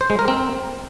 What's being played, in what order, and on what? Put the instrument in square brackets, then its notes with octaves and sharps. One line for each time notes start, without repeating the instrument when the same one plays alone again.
[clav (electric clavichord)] C5
G#3
A#4
C4